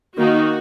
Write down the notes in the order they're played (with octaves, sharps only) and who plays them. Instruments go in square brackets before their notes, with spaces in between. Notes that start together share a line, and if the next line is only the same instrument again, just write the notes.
[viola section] D#3 A#3 D#4 F#4